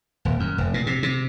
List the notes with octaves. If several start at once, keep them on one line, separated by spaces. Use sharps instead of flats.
D#1
F#2
F1
A#2
C3
C3